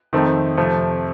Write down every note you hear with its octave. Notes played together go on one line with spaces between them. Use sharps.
F2 D#3 A3 C4
F2 C3 F3 A3